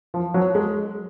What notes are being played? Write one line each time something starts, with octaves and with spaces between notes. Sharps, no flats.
F3
F#3
G#3